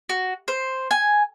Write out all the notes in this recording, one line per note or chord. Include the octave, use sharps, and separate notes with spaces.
F#4
C5
G#5